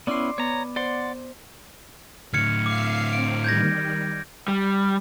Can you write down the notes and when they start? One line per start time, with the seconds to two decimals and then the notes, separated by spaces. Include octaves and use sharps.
0.07 B3 C#4 E4 D5 C6
0.38 B3 C#5 A#5
0.76 C5 D5 F#5 C6
2.34 A2 D3 F6 G#6 C#7
2.66 E5 F5 D6 C7
3.13 C4 D7
3.44 D#3 G3 G6 G#6 A#6
4.48 G3